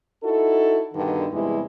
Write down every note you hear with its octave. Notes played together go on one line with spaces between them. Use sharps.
D#4 E4 F#4 A4
G2 B2 D3 D#3
E2 C3 G3 G#3 E4 B4